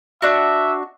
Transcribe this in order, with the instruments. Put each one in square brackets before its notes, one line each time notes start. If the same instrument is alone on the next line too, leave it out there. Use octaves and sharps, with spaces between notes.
[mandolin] D4 F#4 [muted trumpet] E5